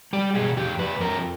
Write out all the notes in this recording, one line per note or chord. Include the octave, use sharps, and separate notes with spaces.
G3 G4
B2 G#4
F2 G4
F2 B4
F2 A#4